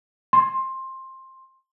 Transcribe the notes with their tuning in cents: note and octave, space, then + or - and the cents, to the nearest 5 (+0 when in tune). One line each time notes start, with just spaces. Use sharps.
C6 +15